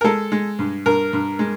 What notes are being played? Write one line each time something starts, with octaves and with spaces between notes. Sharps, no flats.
A#4
G#3 A4
G#3
G2
G2 A#4
G2
G#3